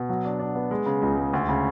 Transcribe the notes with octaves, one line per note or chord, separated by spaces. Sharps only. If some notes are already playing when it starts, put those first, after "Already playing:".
Already playing: B2
F#3
D4
D4
B3
G#3
C#3
C#2
G#3
D2
C#3